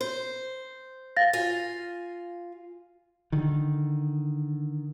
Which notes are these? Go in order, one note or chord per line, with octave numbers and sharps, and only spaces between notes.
C5
F5 A6 A#6
F4 G#5
D3 D#3